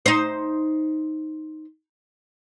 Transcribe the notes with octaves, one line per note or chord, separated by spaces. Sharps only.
D#4 C5